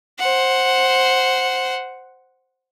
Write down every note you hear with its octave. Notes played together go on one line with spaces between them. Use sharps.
C5 F#5